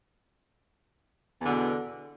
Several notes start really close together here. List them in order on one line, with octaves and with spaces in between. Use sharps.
E2 D3 B2